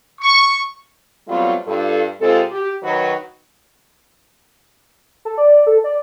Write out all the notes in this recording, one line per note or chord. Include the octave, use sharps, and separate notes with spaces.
C#6
F#3 G3 A3 B3 C4 F4
G2 F4 A4
C3 G#3 C4 F4 A4
G4
D#3 F#3 F#4 B4
A4
D5
A4
D5